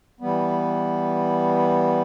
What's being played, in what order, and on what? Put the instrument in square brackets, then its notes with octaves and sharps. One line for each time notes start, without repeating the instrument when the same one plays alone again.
[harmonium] E3 G3 B3